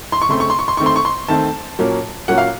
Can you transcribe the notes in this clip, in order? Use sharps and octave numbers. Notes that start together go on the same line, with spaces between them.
C6
C#6
C#3 A3 C4 C6
C#6
C6
C#6
C6
D#3 A3 C4 C#6
C6
C#6
C6
D#3 A3 C4 A5
A#2 F#3 A#3 C#4
A#2 F#3 A#3 C#4 F#5
F5